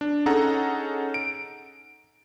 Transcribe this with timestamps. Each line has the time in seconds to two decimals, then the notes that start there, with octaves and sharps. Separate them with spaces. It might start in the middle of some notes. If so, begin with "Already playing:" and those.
0.01 D4
0.26 C#4 D#4 G#4 A4 F#5 A#5
1.14 D7